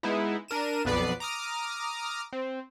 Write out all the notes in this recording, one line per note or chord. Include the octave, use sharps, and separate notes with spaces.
G#3 B3 D#4 E4
D4 A#4 D#7 E7
B1 F2 B3 B4 D5 C7
A#5 D6 D#6 F6
C4